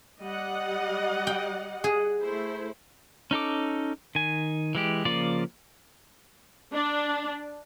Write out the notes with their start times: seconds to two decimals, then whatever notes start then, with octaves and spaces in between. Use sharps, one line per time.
0.21 G3 D#5 F#5
1.27 G5
1.84 G#4
2.21 A3 E4 C5
3.31 C#4 D#4 A4 D6
4.15 D#3 G#5
4.75 E3 G#3 G4
5.05 C#3 F3 A#3 F4 D5
6.72 D4